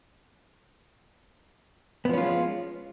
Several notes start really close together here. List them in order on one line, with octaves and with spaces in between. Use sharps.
B3 F3 C#4 F4 G#3